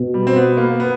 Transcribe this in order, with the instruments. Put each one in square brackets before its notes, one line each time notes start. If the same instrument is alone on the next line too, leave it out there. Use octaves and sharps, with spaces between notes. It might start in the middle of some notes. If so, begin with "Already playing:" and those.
Already playing: [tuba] B2
[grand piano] G3
C4
B3
A#3
B3